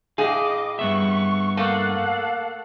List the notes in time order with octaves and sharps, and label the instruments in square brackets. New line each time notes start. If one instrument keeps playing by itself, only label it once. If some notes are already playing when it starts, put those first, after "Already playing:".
[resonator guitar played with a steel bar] A2 G#4 [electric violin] D#5 D6 [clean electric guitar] F5
[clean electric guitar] G2 B3 E5 [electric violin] C#6
[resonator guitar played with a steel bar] A3 A#3 [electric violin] A4 F#5 [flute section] F5